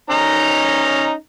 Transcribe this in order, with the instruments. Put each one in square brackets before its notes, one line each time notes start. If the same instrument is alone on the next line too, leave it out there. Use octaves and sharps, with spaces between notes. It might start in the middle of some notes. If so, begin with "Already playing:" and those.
[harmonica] C#4 D#4 A#5